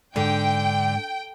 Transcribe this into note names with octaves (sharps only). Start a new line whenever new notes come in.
G#2 D3 G5